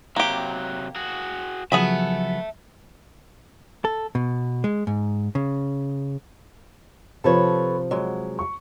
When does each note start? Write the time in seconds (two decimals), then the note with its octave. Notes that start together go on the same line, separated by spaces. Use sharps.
0.16 C3 F#3 A#3 G4
0.96 F#4 G#4
1.72 C#3 F3 F#3 B3 G#4 E5 A5 B5
3.85 A4
4.15 B2
4.64 G#3
4.87 G#2
5.35 C#3
7.24 C3 F3 C4 A4 B4 C#5
7.91 F#3 G#3
8.39 C#6